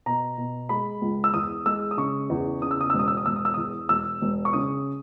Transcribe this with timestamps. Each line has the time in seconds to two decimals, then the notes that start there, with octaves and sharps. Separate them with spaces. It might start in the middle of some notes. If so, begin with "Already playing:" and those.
0.06 B2 A#5
0.38 B2
0.69 G#3 B5
1.02 C#2
1.24 E6
1.34 E2 D#6
1.66 G#3 E6
1.91 D#6
1.97 C#3 C#6
2.30 E2
2.62 C#3 D#6
2.71 E6
2.81 D#6
2.90 E1 E6
2.99 D#6
3.08 E6
3.17 D#6
3.26 E1 E6
3.36 D#6
3.45 E6
3.54 E2 D#6
3.89 E1 E6
4.22 E1
4.45 C#6
4.53 C#3 D#6